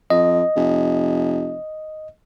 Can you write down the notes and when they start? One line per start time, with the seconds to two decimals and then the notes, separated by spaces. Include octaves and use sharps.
0.10 F2 D#5
0.56 F1